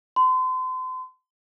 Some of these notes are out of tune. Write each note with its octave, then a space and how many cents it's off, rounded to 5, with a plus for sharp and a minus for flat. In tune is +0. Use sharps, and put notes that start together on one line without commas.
C6 -35